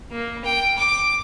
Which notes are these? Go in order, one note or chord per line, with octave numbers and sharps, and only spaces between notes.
A#3
G5
D6